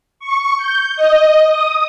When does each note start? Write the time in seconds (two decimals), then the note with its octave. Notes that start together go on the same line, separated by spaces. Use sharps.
0.20 C#6
0.58 G6
0.96 D#5
1.46 D#6